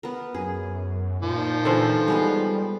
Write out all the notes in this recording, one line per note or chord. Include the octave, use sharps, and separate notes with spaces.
B3 A#4
F#2 G#4
A#2 D#3 F3
D3 E3 A4 C5
G3 G#3 B3 F5